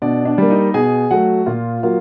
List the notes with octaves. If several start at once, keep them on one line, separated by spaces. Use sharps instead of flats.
B2 D4 D5
D4 D5
G3 A#3
D#4 D#5
B2 G#4 G#5
F#3 A3 F#4 F#5
A#2 F4 F5
F#3 A#3 F4 F5